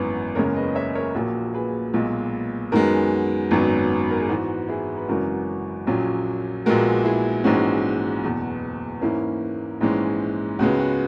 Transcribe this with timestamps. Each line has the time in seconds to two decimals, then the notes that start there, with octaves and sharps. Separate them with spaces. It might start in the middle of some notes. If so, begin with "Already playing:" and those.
Already playing: G#1 F#2 E3 B3
0.35 F#1 E2 C#3 G#3 A#4 C#5
0.55 B4 D#5
0.75 C#5 E5
0.95 A#4 C#5
1.15 A#1 A#2 A#3 F#4 A#4
1.54 G#4 B4
1.94 B1 A#2 G#3
2.72 F#2 D#3 G#3 B3 F#4 A#4
3.51 G#1 F#2 D#3 F#3 B3
4.00 B4
4.11 A#4
4.20 G#4
4.29 G#2 E3 B3 F#4
4.69 E4 G#4
4.97 B4
5.08 G#1 F#2 C#3 E3 F#4 A#4
5.87 A#1 A#2 F#3 C#4
6.65 A#1 A#2 G#3 B3 F#4 A#4
7.04 E4 G#4
7.44 A#1 G#2 E3 G#3 C#4 F#4
8.22 F#1 E2 B2
9.01 G#2 E3 A#3 C#4 E4
9.81 A#1 G#2 E3 G#3 C#4
10.59 C#2 C#3 G#3 B3 F#4
10.79 F#4